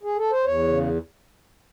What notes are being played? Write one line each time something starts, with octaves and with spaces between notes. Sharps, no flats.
G#4
A4
C5
E2 C#5
C#3